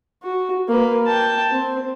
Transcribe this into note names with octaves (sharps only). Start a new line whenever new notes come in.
F#4
A#3 B4
G5 A5
C4